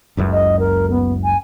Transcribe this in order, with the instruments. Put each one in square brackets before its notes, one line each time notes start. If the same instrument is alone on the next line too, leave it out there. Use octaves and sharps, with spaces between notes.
[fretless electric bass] F#1 C#2 F#2
[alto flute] D#5
A#4
B3
G#5